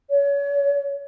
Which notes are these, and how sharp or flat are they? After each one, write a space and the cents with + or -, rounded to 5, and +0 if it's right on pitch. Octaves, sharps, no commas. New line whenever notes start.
C#5 +30